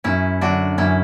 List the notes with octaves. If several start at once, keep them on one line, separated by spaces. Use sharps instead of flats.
F#2 C#4 E4
D3 F#3 D4 F#4
F#2 C#4 E4